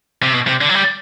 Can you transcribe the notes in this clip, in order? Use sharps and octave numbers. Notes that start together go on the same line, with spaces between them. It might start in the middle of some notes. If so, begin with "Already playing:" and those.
C3
B2
C3
D3
F#3
G3